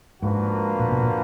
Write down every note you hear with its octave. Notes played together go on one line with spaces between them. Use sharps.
G#2 F3 A#3 D4 F#4 B4
A#2
B2
A#2